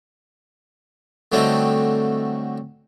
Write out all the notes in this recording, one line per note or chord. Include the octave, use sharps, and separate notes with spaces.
D3 F#3 G3 A3 C4 D#4